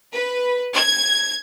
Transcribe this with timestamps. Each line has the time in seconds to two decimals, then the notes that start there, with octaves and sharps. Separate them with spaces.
0.14 B4
0.74 G#6